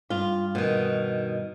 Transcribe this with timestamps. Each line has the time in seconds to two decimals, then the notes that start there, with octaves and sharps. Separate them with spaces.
0.10 G2 F4
0.55 B2 D#3